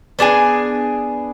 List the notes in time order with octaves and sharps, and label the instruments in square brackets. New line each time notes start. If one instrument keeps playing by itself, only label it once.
[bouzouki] B3 D4 G#4 G#5